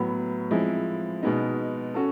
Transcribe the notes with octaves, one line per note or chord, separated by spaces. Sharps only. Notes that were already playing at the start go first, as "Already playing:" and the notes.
Already playing: A2 F#3 B3
F3 G#3 C4 E4
B2 G#3 B3 D#4
C#4 F#4 A4